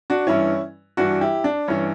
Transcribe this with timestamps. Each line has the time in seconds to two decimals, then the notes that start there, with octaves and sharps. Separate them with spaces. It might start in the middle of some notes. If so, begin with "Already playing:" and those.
0.10 D4 F#4
0.27 G2 E3 C#4 E4
0.97 G2 E3 D4 F#4
1.21 E4 G4
1.44 D4
1.68 G2 E3 C#4